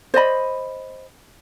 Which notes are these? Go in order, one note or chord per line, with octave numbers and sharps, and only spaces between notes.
C5 D5 D#5 B5